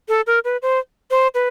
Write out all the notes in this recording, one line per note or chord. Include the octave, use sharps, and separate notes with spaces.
A4
A#4
B4
C5
C5
B4